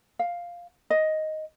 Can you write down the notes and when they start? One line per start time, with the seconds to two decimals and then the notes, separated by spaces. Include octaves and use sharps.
0.19 F5
0.90 D#5